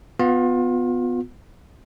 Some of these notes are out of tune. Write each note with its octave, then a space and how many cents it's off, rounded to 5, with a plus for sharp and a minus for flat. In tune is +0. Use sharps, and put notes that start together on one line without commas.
B3 +15 F4 +30